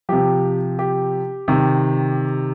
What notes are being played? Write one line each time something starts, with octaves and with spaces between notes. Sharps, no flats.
C3 F3 G4
G4
C3 D#3